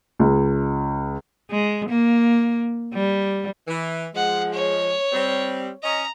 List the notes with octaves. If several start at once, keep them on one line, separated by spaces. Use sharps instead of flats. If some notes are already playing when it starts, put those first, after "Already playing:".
C#2
G#3
A#3
G3
E3
F3 G#3 F#5
C#5
G3 C4
C#4 D#5 A#5